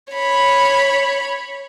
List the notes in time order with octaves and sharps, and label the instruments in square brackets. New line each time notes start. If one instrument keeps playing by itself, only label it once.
[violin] C#5 B5